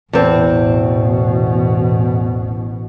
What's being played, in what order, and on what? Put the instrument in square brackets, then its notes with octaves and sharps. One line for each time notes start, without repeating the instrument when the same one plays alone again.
[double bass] A1 B2 [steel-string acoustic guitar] E2 C4